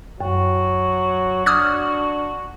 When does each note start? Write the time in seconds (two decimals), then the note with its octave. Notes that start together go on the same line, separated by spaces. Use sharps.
0.21 F#2 F#3 F#4
1.46 D4 D6 D#6 F6 G#6